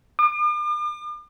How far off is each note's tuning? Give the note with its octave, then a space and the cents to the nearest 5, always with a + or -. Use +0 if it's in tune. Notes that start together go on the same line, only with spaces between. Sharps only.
D6 +45